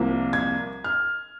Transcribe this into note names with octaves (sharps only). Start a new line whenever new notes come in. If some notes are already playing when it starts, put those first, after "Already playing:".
Already playing: C2 C3 F3 A#3
G#6
F6